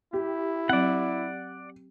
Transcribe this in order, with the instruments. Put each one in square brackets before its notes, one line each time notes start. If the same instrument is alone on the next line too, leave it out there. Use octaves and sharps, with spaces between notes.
[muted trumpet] E4 [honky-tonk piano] G4
[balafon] F#3 C4 [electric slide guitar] D5 F#5